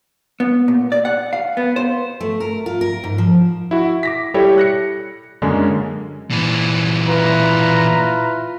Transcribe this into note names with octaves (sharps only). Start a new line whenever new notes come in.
B3
A#2
D5
F#5
F5
B3
C5
A3
A#4
F4
A#4
G#2
F3
E4 F#4
D6 A#6 B6
G3 E4 G4 A4 C#5
F#6 A#6 C#7
F#2 D3 G#3 A#3 C#4
A#2 E3
E4 F4 B4 A#5